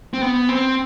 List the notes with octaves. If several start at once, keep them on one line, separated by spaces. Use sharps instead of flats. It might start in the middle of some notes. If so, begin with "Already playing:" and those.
C4
B3
C4